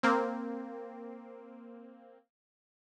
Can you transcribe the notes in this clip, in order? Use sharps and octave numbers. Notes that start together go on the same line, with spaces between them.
A#3 C4